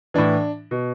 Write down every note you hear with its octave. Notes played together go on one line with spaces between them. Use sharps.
A2 E3 D4
B2